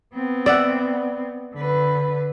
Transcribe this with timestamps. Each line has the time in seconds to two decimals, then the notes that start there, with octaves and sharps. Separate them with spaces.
0.14 B3 C4
0.46 D5 E5 F#5
1.54 D3 B4